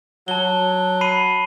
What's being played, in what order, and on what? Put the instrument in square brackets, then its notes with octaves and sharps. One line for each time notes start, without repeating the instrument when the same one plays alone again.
[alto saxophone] F#3 [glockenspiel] A5 G7
[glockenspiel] B5 C7 D#7